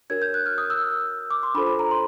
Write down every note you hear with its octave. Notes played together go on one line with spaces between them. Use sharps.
D4 F#4 A#4 C#5 G#6
G6
F#6
F6
D#6
E6
D6
C6
D4 F4 A4 C5 B5
B5
A#5
C6